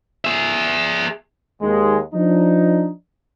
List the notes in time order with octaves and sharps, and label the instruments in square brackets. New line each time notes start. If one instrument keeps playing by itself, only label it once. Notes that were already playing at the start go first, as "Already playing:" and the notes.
[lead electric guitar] G#4 E5
[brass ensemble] D#2 G#3
F3 D4 D#4